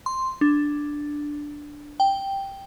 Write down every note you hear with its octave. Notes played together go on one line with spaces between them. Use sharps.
C6
D4
G5